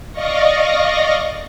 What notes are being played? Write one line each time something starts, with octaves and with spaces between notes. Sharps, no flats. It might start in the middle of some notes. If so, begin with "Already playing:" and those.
D5 D#5 F5 C#6 A#6